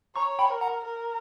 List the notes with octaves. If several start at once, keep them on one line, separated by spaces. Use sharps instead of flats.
C#5 A#5 C#6
G5 B5
A#4
F#5 A#5
A#4